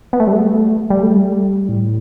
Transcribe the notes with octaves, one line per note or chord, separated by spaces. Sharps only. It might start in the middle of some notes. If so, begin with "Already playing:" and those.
B3
A3
G3
A3
G3
A3
G3
A2